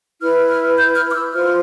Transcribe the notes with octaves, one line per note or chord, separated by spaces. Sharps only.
E4 B4 F6
F6
G6
F6
D6
E6
F4 C5 F6